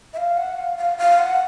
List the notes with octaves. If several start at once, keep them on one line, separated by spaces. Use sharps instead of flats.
E5
F5
F#5
F5
F5
F5
F#5